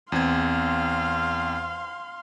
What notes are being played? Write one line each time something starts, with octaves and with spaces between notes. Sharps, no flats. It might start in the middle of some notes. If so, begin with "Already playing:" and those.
E2 C4 F5 C6 G#6